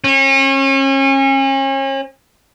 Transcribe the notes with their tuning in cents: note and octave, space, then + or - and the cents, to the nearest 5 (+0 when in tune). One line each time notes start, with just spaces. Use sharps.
C#4 -35